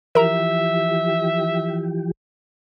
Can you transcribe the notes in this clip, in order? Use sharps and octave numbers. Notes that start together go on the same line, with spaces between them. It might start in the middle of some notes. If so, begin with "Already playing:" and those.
E3 F3 G4 A#4 E5 A#5